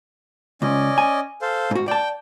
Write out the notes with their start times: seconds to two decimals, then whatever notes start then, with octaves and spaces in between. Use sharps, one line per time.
0.62 C#2 C#4 D5 D#5
0.98 G#5
1.42 A4 C5 F5
1.71 G#2 F#4
1.88 D5 G5 A5